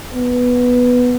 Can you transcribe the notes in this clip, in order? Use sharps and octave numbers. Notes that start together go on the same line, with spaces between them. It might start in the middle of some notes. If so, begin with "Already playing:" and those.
B3